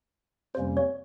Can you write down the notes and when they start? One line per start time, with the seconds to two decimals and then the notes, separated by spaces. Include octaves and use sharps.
0.55 F2 C3 G3 A#3 C#4 C5
0.77 C#5